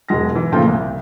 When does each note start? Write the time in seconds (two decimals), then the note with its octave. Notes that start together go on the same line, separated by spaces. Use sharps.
0.09 E1 F#3 G#3 A#6
0.35 E3
0.52 A#2 C#3 F3 A3 G5
0.67 C2